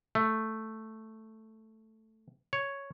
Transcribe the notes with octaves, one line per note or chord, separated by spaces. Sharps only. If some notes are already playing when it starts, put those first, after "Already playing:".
A3
C#5